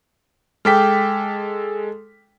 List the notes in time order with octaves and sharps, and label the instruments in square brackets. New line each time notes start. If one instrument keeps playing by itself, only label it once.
[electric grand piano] G#3 A4 B6 [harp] G5 D6 F6